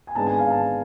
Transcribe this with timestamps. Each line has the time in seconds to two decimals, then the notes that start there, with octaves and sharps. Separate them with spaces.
0.07 G#5
0.15 G#1 G#2 G#3 B3 D4 A5
0.27 G#5
0.38 F5
0.51 A5